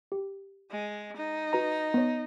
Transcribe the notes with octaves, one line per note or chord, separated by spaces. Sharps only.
G4
G#3
D#4
F#4 B4 A#5
B3 C#5